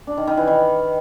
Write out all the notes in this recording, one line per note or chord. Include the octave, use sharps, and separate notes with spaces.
D4
D#3
D#3
E3
D#3